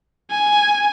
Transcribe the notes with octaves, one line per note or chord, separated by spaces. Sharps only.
G#5